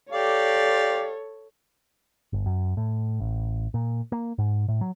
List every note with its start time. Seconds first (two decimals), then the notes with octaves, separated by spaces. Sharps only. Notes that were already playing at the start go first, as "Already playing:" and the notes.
0.12 G4 A4 C#5 D5 F5
2.33 G1
2.46 F#2
2.77 A2
3.20 A1
3.74 A#2
4.12 A#3
4.38 G#2
4.68 A2
4.81 F#3